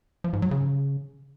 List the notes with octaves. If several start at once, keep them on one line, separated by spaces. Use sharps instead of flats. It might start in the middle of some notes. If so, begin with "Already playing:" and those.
F3
G#2
F#3
C#3